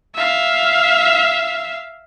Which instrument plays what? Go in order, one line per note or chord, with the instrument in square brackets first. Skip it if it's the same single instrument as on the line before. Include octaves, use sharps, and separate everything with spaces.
[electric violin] E5 F5